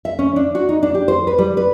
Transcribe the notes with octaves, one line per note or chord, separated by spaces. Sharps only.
E5
C#4
D4
F#4
D#4
D4
G4
C5
B4
G3
B4